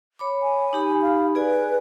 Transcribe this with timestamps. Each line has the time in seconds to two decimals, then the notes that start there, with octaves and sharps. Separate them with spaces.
0.19 C#5 B5 D6
0.42 G#5
0.73 D#4 G4 B5
1.02 F5
1.35 G#4 B4 D5 G#5